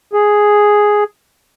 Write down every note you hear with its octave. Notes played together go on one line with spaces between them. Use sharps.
G#4